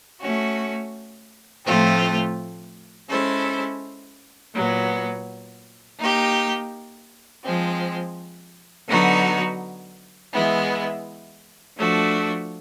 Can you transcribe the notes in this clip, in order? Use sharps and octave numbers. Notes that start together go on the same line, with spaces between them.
A3 C#4 F#4
A2 F3 A3 C4 F4
G#3 C#4 E4 A4 C5
A#2 F#3 B3
A#3 D#4 G4
F3 G#3 C4
D3 F#3 B3 D#4 F#4
E3 G#3 B3 E4
F3 A3 D4 F#4